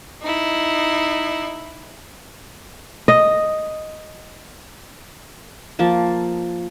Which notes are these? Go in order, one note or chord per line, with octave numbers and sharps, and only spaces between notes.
D#4 E4
D#5
F3 A#3 A5